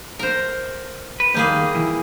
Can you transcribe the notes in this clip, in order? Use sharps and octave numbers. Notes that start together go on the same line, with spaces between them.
A#4 C5
B4
D#2 G3 A#3 G#4
E3